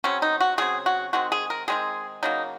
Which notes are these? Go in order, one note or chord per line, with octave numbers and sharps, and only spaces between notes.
C#3 F#3 C4 C#4
D#4
F#4
C#3 F#3 C4 G#4
F#4
D#3 G#3 C4 F#4
G#4
A#4
D#3 G#3 C4 G#4
C#3 F#3 A#3 D#4